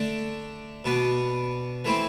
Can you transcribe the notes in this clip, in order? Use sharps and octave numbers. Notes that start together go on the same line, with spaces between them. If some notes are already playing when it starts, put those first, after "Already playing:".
Already playing: D3 A3 D4
B2 B3 D4
E3 A3 C4 E4